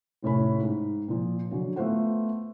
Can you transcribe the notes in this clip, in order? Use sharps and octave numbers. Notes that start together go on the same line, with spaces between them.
F1 A2 C#4 B5
G#2
A#2 F3
D3 F#3 C#4
A3 B3 F4 C5 F#5